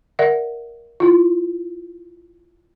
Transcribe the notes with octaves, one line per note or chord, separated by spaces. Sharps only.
A#4 D5 E5 F#5
E4 F4